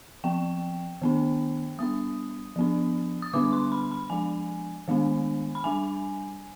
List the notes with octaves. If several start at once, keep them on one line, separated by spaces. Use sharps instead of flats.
F3 C4 G5
D#3 B3 D4
G3 B3 D4 D#6
F3 B3 D4
D#6
D3 G3 B3 D4 D6
C6
B5
B5
F3 G#3 D4 G#5
D#3 G#3 B3 D4
B5
G3 D4 G#5